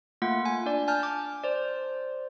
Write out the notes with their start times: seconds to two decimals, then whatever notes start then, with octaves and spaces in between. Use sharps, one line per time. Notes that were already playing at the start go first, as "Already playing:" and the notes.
0.22 A3 A#3 F4 F#5
0.45 G#5
0.66 D4 D5
0.88 G#5 A5 F6 G6
1.03 D6
1.44 C5 D5